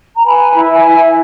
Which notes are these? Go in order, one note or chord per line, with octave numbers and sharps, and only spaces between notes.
A#5
B4 G#5 B5
E4
E5 G#5
E4